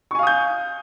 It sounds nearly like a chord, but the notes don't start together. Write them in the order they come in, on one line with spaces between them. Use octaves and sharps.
C#6 G#5 F5 D#6 G6